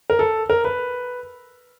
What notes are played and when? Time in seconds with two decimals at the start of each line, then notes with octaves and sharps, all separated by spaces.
0.10 A#4
0.19 A4
0.50 A#4
0.65 B4